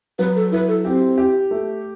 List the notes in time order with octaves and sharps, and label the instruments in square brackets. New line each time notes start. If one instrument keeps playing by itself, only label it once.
[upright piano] F#3 [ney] B4
[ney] A4
[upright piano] E4 [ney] B4
[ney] A4
[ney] C4 [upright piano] G4
[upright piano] G4
A3